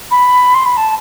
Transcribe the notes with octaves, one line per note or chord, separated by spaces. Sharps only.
B5
C6
B5
A5